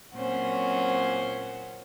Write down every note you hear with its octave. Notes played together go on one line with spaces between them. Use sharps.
A#2 F#3 C4 C#4 C5 F#5